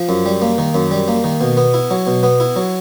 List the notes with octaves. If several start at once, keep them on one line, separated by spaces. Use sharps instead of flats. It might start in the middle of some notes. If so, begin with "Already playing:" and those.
Already playing: F3
F#2
G3
A#3
D#3
F#2
G3
A#3
D#3
B2
B3
E4
F#3
B2
B3
E4
F#3